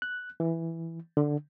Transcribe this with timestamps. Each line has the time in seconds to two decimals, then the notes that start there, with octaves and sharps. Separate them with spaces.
0.02 F#6
0.40 E3
1.17 D3